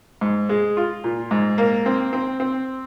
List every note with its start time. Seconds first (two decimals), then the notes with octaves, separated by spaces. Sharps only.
0.21 G#2
0.49 G#3
0.77 F4
1.04 A#2
1.31 G#2
1.58 A#3
1.86 C4
2.13 C4
2.40 C4